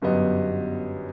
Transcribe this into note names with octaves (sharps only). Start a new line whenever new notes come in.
G1 F#2 G3 B3 D#5